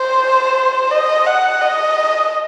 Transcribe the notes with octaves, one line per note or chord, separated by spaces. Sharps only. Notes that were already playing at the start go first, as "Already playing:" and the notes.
Already playing: C5
D#5
F#5
D#5